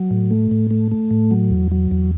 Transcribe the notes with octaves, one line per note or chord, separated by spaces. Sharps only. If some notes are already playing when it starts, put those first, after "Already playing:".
Already playing: F#3
A2
A3
A2
A3
A3
A2
F#3
E2
F#3
E2